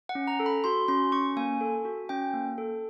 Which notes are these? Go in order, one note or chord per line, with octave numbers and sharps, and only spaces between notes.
F#5
C#4
A#5
A4
B5
F#4 C6
C#4 C6
C#4 C#6
A#3 G#5
A4
F#4
C#4 G5
A#3
A4